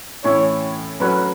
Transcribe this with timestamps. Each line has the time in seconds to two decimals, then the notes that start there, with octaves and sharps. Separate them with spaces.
0.24 A2 E3 C#4 E4 C#5
1.00 F#2 F#3 A3 C#4 F#4 B4